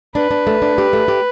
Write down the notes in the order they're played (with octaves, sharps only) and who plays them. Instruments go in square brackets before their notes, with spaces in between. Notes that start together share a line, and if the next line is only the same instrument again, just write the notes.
[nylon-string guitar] D4 [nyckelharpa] B4
[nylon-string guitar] D4
A3
D4
G4
A3
G4